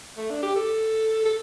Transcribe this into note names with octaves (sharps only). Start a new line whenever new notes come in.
A3
D4
G4
A4
A4